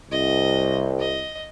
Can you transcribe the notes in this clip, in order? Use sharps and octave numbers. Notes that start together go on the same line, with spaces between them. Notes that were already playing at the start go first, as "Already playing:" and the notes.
C2 D#5
D#5